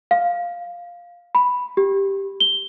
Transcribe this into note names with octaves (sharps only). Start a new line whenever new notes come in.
F5
B5
G4
G7